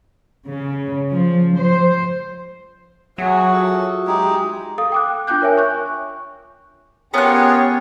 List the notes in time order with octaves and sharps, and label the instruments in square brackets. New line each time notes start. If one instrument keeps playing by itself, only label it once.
[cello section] C#3
F3
C5
[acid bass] F#3 [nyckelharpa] F#4 G#4 [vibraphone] E5 F#5 G#5
[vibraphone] F4 E5 D#6 [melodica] A4
[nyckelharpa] G#3 [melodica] D#4 G4 G#4
[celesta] A4 F5 D#6
G5 D6 F#6
D4 F4 G5 D6 F#6 G6
A#4 C#5 E5 G#5
C#6 F#6
[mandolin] B3 F#6 [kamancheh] C#4 G4 [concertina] F4 G#4 A#4 [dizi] C#5